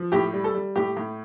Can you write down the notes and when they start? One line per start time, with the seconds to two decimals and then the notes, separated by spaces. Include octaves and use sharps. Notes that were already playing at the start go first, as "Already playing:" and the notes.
Already playing: F3
0.12 A2 G4
0.33 G3
0.44 A4
0.55 G3
0.76 A2 G4
0.97 A2